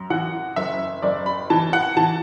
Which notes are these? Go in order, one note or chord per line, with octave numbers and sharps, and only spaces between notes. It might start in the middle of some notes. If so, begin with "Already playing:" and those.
Already playing: F#2
E3 F#5
F#1 E5
F#1 D5
B5
E3 A5
F#5
E3 A5